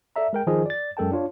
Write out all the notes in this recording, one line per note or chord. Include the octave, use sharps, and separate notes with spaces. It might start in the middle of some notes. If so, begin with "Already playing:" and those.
A4 D5 E5 A#5
G#3 A#4 G5
D#3 F3 D#4 G#4 D#5
D5 A6
F#2 G#3 A4 A#4 G5 A5
D4 F4 C#5